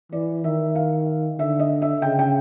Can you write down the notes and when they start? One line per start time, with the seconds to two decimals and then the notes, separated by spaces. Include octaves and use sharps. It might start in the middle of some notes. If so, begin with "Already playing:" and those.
0.12 E3 D5
0.43 D#3 E5
0.75 F5
1.38 D3 E5
1.59 D#5
1.82 E5
2.02 C#3 G5
2.19 G5